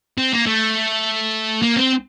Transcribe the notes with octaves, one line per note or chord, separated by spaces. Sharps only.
C4
A#3
A3
A#3
C4